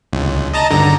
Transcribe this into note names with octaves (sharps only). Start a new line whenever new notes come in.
C#2
D#5 A5 A#5
G2 D3 A#5